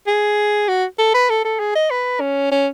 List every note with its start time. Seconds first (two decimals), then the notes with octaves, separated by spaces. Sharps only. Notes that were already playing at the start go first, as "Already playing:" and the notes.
0.07 G#4
0.68 F#4
0.99 A4
1.14 B4
1.30 A4
1.44 A4
1.60 G#4
1.75 D#5
1.91 B4
2.21 C#4
2.52 C#4